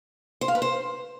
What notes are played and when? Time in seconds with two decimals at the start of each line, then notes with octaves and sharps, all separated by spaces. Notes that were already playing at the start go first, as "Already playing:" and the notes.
0.41 C5
0.48 F5
0.55 B4
0.62 C5